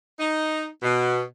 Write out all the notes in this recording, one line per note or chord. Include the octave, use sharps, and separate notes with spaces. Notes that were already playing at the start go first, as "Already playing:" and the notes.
D#4
B2